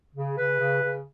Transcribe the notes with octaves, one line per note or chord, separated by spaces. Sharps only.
C#3
C#3 B4
C#3
C#3